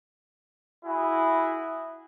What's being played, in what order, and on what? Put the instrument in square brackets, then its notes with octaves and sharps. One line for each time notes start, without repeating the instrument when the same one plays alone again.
[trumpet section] E4 F#4 G#4